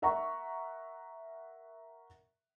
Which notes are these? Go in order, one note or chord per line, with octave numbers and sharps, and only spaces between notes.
A#4 E5 F#5 A#5 C#6